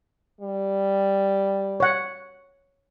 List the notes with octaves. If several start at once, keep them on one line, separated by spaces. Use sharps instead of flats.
G3
C#5 F#5